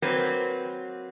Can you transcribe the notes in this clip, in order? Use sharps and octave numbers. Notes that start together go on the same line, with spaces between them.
F#3 A#3 C4 B4